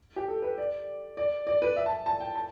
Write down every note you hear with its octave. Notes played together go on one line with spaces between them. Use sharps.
G4
A4
B4
D5
D5
D5
B4
E5
A5
A5
G5
A5